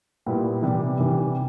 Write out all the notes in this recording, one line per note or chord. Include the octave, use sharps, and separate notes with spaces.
A#2 G3 B3 E4
C3 E3 G3
C3 E3 G3